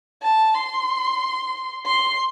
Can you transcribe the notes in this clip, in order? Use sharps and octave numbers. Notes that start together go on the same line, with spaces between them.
A5
C6
C6